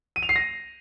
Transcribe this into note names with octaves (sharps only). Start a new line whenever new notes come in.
D#7
F7
C7
A#6